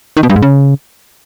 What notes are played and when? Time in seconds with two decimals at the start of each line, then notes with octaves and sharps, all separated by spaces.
0.17 D#3
0.23 B2
0.30 G2
0.36 G#2
0.42 C#3